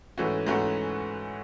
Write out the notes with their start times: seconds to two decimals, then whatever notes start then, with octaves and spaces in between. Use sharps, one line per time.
0.18 G#2 E3 A3 C#4 F#4
0.47 G#2 E3 A3 C#4 F#4